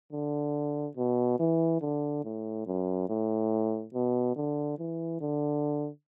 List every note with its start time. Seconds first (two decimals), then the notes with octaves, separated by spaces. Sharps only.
0.12 D3
0.97 B2
1.39 E3
1.81 D3
2.24 A2
2.66 F#2
3.09 A2
3.94 B2
4.36 D3
4.79 E3
5.21 D3